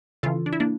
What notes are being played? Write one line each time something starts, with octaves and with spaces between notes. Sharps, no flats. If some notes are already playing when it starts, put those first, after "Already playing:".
C#3 E3 F4 A4
D4
E4
A#3 D4